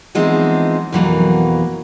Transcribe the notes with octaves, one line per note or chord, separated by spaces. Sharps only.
E3 F3 G#3 B3 C4 D#4
F2 B2 E3 F#3 A#3